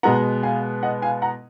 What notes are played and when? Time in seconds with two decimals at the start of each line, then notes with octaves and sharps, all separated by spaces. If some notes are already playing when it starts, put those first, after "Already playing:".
0.03 B2 G#3 B3 F#5 A#5
0.43 F5 G#5
0.83 D#5 F#5
1.02 F5 G#5
1.22 F#5 A#5